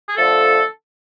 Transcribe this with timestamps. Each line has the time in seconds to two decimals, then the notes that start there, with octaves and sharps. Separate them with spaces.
0.09 G#4
0.16 D3 F3 A3 A4